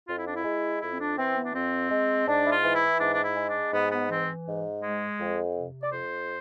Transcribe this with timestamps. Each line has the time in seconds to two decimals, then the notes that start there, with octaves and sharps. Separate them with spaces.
0.08 F2 F4
0.17 E4
0.26 D4
0.35 E4
0.44 G#3
0.82 F2 E4
0.92 C4
0.99 D4
1.17 E3 C4
1.36 B3
1.45 D4
1.54 F2 C4
1.90 G#3
2.27 G#2 D4
2.47 E4
2.51 F4
2.63 E3
2.75 E4
3.00 G#2 D4
3.13 D4
3.24 E4
3.36 G#3
3.49 D4
3.73 G#2 B3
3.91 B3
4.09 E3 C4
4.46 G#2
4.82 G#3
5.19 F2
5.56 C3
5.83 D5
5.92 F2 C5